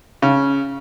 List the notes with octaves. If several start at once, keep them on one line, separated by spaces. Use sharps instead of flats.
C#3